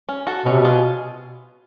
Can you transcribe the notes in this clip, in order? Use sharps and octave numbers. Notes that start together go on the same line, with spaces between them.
C#4
F#4 A4
B2 C#4
C3
B2 F4 G#4